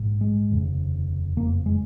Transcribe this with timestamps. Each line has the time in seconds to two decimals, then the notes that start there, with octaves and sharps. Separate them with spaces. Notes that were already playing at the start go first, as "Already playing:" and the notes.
Already playing: A#1 G#2
0.21 G#3
0.50 F1 D#2 C#3
1.37 F#1 F2 C#3 A#3
1.66 G#3